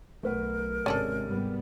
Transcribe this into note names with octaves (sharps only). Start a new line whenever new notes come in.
B1 F#3 A3 A#4 B4 F#5
G#1 C3 G#3 C#4 D4 A4 A6 D#7
G#2 G3 B3